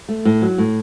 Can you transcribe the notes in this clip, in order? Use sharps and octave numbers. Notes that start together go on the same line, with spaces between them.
A3
A2
F#3
A2